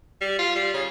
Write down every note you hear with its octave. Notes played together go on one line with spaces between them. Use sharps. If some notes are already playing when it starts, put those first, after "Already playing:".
G3
F4
G3
C#3